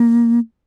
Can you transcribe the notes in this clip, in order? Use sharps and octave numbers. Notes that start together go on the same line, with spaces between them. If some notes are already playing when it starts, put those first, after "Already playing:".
Already playing: A#3